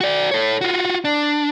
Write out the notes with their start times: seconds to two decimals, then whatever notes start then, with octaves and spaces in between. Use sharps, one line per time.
0.01 F#4 D5
0.31 A4 C#5
0.61 F4 F#4
1.05 D4